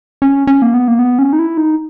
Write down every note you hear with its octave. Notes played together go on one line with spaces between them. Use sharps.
C#4
C#4
A#3
B3
A#3
B3
C#4
D#4
E4
D#4